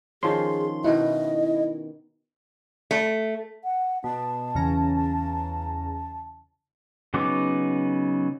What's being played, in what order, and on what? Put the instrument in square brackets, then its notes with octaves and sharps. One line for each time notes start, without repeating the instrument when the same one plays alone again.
[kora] D#3 F3 C#4 [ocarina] G#4 [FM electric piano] C6
[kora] B2 D#3 F#5 [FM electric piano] E4 [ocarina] D#5
[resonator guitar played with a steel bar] A3
[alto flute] F#5
[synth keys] B2 [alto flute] A5
[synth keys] E2 C#3 A#5
[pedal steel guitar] C#3 F#3 B3 D#4 D6